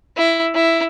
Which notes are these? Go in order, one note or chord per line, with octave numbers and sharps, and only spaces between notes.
E4
E4